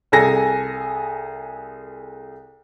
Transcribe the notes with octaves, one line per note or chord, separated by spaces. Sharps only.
C2 G#4 A4 G#5 A#6